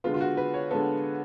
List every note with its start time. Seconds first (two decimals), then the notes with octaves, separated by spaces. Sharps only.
0.04 D3 G#3 B3 F4
0.14 F4
0.21 F#4
0.37 B4
0.54 C#5
0.71 D3 G#3 B3 A4